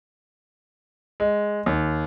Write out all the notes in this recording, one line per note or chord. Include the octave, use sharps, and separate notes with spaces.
G#3
D#2